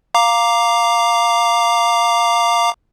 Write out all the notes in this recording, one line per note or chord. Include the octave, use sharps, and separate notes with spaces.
F5 A#5 D6